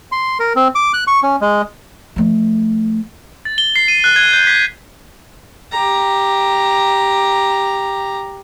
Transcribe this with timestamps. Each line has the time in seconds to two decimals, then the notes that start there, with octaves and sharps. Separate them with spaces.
0.12 C6
0.40 A#4
0.56 C4
0.75 D6
0.93 F#6
1.07 C#6
1.23 C#4
1.41 G#3
2.16 F3 A3
3.45 A6
3.58 G7
3.76 C7
3.88 D#7
4.04 F#6
4.16 G#6
4.33 G6
4.47 B6
5.72 G4 A#5